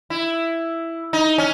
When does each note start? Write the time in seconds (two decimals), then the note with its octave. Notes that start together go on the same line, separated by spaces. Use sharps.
0.10 E4
1.13 D#4
1.38 C#4